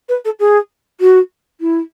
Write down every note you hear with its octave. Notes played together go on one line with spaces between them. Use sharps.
B4
A4
G#4
F#4
E4